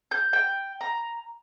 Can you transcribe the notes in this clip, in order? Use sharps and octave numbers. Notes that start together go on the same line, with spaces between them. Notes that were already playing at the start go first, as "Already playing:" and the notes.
G6
G5
A#5